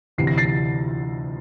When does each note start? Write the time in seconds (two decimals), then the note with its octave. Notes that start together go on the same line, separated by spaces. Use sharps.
0.18 D2 C3 E3 C7
0.27 A#6
0.38 A6 C7